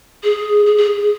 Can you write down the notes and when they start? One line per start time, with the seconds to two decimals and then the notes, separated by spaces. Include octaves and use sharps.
0.24 G#4
0.66 G#4
0.77 G#4